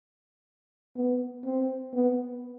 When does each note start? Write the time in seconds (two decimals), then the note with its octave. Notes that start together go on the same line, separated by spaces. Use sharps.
0.96 B3
1.45 C4
1.94 B3